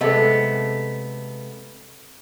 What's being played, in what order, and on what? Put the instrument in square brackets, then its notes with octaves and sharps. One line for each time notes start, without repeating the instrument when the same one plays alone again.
[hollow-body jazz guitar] C3 G#3 [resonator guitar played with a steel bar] A3 B3 [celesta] A4 D#5